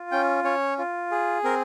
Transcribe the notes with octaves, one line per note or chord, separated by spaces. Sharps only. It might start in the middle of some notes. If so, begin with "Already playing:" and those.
Already playing: F4
C#4 G5
C#4 C#5
F4
G#4
C4 A#4